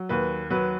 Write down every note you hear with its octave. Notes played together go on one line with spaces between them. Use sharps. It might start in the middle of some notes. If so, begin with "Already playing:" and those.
Already playing: F#3
D#2 B4
F#3 B4